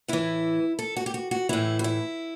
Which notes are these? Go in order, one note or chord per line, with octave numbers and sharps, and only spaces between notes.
A2 E3 E4
A4
F#4
G4
F#4
F#4
A2 E3 E4
F#4
E4